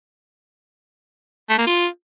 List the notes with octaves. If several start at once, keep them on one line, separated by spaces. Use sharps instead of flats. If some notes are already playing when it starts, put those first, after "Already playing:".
A3
A#3
F4